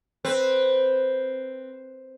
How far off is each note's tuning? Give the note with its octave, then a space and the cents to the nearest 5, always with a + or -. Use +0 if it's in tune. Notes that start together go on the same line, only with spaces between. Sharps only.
C4 +0 B4 +0